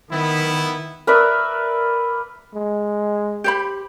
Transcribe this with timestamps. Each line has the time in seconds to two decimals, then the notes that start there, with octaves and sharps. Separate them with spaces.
0.11 D#3 B3 E4
1.07 A#4 B4 D5 E5
2.54 G#3
3.44 G4 C5 B5